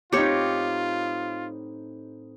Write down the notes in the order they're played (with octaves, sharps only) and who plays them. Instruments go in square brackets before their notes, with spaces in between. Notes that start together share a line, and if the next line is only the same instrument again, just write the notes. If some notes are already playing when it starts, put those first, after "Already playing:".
[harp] A2 C4 D#4 [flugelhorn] F4 [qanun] G4 C#5